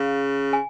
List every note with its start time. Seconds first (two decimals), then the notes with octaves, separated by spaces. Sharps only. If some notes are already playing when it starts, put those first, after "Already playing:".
Already playing: C#3 F5
0.53 G#5